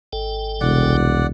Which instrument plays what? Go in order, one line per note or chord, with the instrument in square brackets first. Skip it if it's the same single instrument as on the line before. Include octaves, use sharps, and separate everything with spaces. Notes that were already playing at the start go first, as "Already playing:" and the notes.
[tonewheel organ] G#1 A4 G5
[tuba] E1 [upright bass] C2 [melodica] D5 F#5